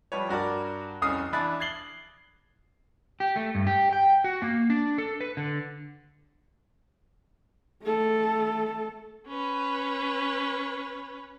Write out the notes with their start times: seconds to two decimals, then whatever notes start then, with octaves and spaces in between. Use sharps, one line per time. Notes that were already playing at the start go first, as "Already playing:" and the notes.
0.12 F3 G3 B4 C#5
0.29 G2 F#4 A#4 D5
1.02 F1 C2 C#4 D#6 F6 C7
1.33 E3 D4 E4 B5 F#6 A6
1.60 G#6 A6 C7 F#7 G7
3.20 G4
3.36 A3
3.55 G2
3.67 G4
3.93 G5
4.24 F#4
4.42 A#3
4.70 D4
4.98 A4
5.21 B4
5.37 D3
7.83 A3 A4
9.28 C#4 B4